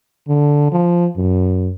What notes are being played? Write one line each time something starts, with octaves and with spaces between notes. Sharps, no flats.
D3
F3
F#2